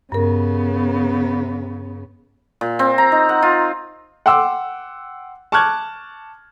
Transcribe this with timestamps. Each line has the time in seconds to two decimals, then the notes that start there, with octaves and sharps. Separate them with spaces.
0.12 G2 C#3 B3 A#4
2.61 A#2
2.79 C4
2.98 A#5
3.12 D#4
3.29 F#5
3.42 F4
4.26 F#5 G5 C6 D6 E6
5.52 A5 C#6 D6 F6 F#6 G#6